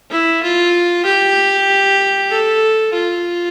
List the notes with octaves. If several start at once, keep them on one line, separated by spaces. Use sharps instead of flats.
E4
F4
G4
A4
F4